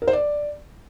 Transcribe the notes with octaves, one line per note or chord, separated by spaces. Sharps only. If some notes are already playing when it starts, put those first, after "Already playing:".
A#4
C5
D5